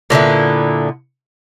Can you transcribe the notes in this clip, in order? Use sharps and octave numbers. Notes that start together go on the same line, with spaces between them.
A#2 D3 B3 E4